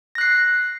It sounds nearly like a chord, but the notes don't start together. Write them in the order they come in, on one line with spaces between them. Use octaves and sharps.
A#6 F#6 C7